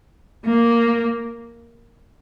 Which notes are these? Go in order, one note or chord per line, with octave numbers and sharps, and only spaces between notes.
A#3